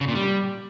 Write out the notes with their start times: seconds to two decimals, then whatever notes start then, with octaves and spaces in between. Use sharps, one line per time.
0.01 C#3
0.08 A#2
0.15 G3